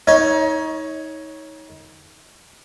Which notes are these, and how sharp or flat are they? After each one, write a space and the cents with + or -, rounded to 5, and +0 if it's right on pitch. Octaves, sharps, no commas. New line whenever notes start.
D#4 +30 C#5 +0